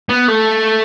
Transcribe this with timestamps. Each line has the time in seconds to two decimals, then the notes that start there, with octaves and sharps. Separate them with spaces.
0.09 B3
0.28 A3